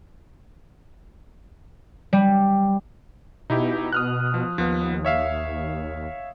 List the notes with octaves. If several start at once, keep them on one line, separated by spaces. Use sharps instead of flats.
G3
B2 D#4 E4 G4
D#6 F6 F#6
F3
D#2 F3 B3
C#5 E5 F5